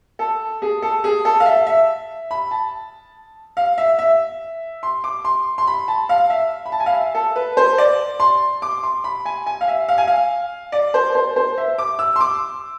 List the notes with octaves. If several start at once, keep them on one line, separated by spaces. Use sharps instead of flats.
A4
G#4
A4
G#4
A4
F5
E5
E5
B5
A5
F5
E5
E5
C6
D6
C6
C6
B5
A5
F5
E5
B5
A5
G#5
F5
E5
A4
B4
C5
D5
C6
D6
C6
B5
G#5
G#5
F5
E5
F5
G#5
F5
D5
C5
C5
C5
E5
D6
E6
C6
D6